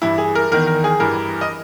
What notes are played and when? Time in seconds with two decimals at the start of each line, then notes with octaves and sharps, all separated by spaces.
0.02 G2 E3 E4
0.18 G#4
0.35 A#4
0.52 E2 D#3 A#4
0.67 A#4
0.84 G#4
1.00 G2 E3 A#4
1.41 D#5